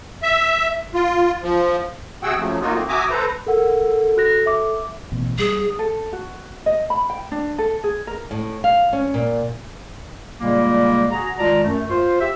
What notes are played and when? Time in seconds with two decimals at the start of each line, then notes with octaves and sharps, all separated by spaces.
0.23 E5
0.95 F4
1.43 F3
2.23 C3 F#4 G#4 F#5 G5 E6
2.39 C#3 F3 F#3 A3
2.61 F#3 A#3 D#4 F4 F#4
2.74 A3 A#3 C4
2.89 F#4 E5 G#5 A#5 D6 D#6
3.10 A4 B4 C5 A#5
3.47 A4 A#4 F#5
4.17 F#4 F#6 A#6
4.46 E5 D6
5.12 A1 B2
5.38 G3 G#4
5.79 A4
6.13 F#4
6.66 D#5
6.90 B5
7.10 G5
7.32 D4
7.58 A4
7.84 G#4
8.07 A#4
8.31 A2
8.64 F5
8.93 C#4
9.14 A#2
10.41 A#2 C#3 G3 G#3 A#3
11.11 F#4 G#4 A#5
11.39 D#3 G#3 F4 D5 A5 A#5
11.64 F#2 A3
11.90 F4 C5
12.21 G4 E5